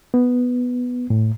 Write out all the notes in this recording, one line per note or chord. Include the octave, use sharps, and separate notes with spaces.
B3
A2